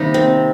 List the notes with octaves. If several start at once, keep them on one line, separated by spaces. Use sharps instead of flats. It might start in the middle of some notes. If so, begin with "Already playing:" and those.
Already playing: C3 D#3 G3 A#3 D#4 G4
C4